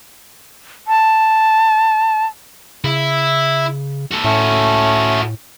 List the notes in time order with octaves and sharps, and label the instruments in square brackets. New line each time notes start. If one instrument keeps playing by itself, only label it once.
[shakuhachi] A5
[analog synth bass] C#3 [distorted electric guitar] E4
[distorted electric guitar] F#4 A4
[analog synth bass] A2 [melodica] A3 C#4